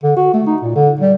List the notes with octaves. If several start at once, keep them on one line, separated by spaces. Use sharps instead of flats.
D3
F#4
A3
D#4
A#2
D3
G3